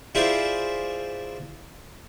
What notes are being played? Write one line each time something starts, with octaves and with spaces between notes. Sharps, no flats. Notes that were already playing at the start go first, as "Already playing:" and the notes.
E4 F4 G#4 C5 D5 E5